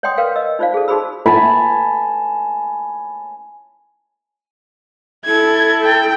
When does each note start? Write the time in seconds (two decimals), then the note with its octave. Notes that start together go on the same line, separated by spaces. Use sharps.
0.03 C#5 D5 F#5 G5 C6 D#6
0.18 A#4 B4 F5 G5
0.36 D#5 E6
0.59 D#4 F4 C5 D5 F5
0.74 G#4 A4
0.88 D#4 F#4 G#4 C5 B5 E6
1.26 G#5 A5 B5
5.26 E4 A4 G#6
5.83 G5